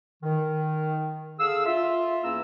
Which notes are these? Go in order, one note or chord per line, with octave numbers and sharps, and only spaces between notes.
D#3
D3 G#4 F5 E6
F4 E5
E2 A#3 C#4 E4 A#5 E6